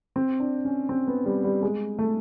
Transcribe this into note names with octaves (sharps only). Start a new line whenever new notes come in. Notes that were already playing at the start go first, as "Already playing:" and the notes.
C4
D4
C#4
C4
B3
G3
G3
G#3
A3